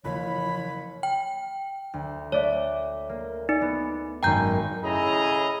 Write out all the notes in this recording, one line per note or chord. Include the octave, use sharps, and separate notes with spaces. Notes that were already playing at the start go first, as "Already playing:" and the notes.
F#1 E3 F3 C#5 B5
G5
D2
A3 C#5 D5 E5
A#3
D#4 D5
B3
G#1 F#2 G5 A#5 G6
A2 C#3 E4 G#4 D#5 A#5